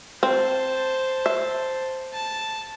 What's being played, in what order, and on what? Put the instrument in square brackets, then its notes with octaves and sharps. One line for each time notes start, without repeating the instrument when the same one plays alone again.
[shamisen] C4 [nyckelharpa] C5 A5
[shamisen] E5
[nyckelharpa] A5